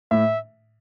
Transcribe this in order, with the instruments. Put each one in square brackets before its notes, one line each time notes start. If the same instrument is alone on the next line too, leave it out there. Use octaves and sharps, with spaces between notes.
[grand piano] A2 [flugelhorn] E5